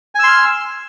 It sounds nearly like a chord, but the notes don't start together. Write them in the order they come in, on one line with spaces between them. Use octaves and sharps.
G#5 E6 C6 F6